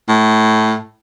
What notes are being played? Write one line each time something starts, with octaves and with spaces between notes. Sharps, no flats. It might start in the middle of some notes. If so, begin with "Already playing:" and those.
A2